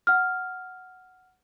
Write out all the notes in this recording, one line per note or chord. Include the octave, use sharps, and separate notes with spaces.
F#5 F6